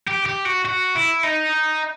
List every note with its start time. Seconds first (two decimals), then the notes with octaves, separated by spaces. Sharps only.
0.08 G4
0.26 G4
0.46 F#4
0.65 F#4
0.95 E4
1.23 D#4